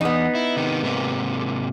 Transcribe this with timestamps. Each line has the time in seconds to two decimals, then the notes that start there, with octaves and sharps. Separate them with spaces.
0.01 E2 B3 D#4
0.35 E4
0.57 C3 D#3
0.82 G#2 C3 A#3